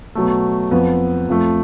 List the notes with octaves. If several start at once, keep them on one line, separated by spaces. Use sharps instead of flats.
B2 F#3 A3
F2 F3 B3
F2 F3 A3